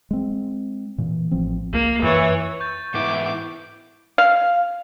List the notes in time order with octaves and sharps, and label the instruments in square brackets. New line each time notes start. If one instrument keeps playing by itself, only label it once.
[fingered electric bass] G#3 C4
A#2 E3
A1 F3 C4
[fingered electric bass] C#2 [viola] A#3
[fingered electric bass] F#2 [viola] E3 C#5
[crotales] C#6 G6 A6
[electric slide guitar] G#2 B3 E4 [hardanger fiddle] D6
[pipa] F5